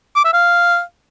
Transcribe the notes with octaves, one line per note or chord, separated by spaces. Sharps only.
D6
E5
F5